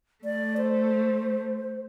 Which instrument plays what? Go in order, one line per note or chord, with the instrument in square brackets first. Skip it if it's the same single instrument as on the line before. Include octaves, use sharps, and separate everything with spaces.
[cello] A3 [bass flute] D5
[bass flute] C5